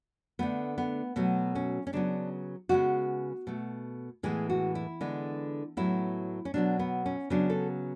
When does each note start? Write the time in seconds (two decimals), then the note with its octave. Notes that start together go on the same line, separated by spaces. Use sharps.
0.39 D3 A3 B3
0.78 B3
1.16 B2 F#3 A3 B3
1.55 C#4
1.87 C#4
1.93 C#3 F#3 B3 D4
2.69 C#3 G#3 B3 F#4
3.47 B2 A3
4.23 A2 E3 G#3 B3 G#4
4.49 F#4
4.75 E4
5.01 D3 G#3 B3
5.77 A2 F#3 B3 E4
6.45 C#4
6.54 B2 F#3 B3 D4
6.79 B3
7.06 C#4
7.30 C#3 F#3 B3 D4
7.50 A4